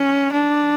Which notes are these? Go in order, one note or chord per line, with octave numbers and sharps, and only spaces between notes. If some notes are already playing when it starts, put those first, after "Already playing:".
Already playing: C#4
D4